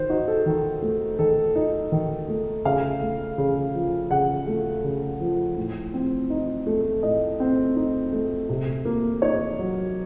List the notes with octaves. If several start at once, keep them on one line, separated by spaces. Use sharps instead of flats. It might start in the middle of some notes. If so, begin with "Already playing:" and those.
Already playing: D#3 C5
D#4 F#4
A4
D#3
A3
D#3 A4
D#4
D#3
A3
C#3 F5
A3
C#3
F3
C#3 F#5
A3
C#3
F3
A2
C4
D#4
A3
A2 D#5
C4
D#4
A3
C3
A#3
D#4 C#5
F#3